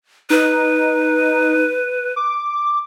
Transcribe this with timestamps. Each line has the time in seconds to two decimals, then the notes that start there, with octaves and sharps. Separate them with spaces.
0.30 D#4 B4
2.16 D6